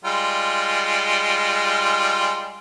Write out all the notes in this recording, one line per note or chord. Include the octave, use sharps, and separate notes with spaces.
G3 G#3 F4